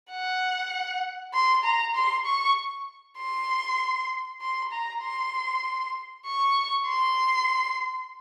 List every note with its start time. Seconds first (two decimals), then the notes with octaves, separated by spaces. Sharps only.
0.11 F#5
1.33 C6
1.63 A#5
1.95 C6
2.26 C#6
3.18 C6
4.41 C6
4.72 A#5
5.02 C6
6.25 C#6
6.86 C6